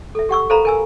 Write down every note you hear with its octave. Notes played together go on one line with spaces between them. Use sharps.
A4 E5
G4 F#5 C#6 E6
A4 A#4 C5 F5 A#5 B5
A#4 G#5 E6